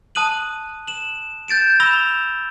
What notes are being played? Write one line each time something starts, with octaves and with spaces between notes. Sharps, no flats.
A5 D#6 F#6 D#7 F#7
E7 F#7
G6 A6 D7 E7
B5 E6 A#6 E7 F7 G7